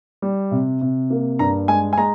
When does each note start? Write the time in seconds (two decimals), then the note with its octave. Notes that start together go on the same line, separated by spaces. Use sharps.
0.22 G3
0.51 C3
0.81 C3
1.10 A#3
1.39 G2 A#5
1.68 G#3 G#5
1.93 G#5
1.98 G#3 A#5